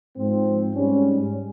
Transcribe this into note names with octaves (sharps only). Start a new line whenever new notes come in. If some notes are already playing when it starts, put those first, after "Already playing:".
G#2 F3 C4
G#2 G3 C#4